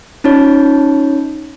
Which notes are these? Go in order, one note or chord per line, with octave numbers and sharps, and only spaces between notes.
C#4 D#4 F4 C#5